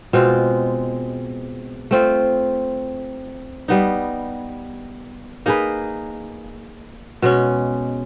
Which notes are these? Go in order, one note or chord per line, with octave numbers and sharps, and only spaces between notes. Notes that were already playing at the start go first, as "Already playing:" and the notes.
B2 G#3 C4 F4
A3 C4 F4
G3 B3 D#4
A#3 D#4 G#4 B4
B2 G#3 C#4